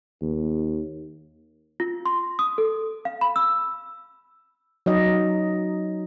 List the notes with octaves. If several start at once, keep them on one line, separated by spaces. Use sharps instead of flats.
D#2
F4
C6
D#6
A4
F5
B5
E6
F#3 D#4 D#5